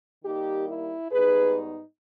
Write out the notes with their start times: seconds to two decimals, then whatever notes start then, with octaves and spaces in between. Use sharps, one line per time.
0.24 D#3 G3 A#3 D#4 G4
0.68 E4
1.11 G#2 G3 B3 D#4 G#4 B4